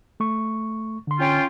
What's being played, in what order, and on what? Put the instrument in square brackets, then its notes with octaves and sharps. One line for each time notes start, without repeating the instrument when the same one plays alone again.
[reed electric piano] A3 C#6
D3 C6
[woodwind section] C#4 F4 G5